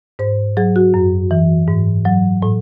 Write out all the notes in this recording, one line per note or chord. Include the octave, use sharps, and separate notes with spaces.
G#2 C5
F#3 G#4
F#4
F#2
E3
G#2
F#3
A2